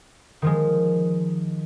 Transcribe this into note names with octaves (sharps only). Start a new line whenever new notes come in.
D#3 F3 G#3